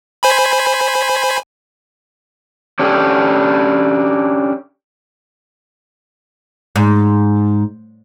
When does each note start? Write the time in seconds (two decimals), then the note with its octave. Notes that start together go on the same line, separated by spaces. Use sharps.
0.23 C5 G#5 B5
2.79 C#4 D4 G4 A4
6.76 G#2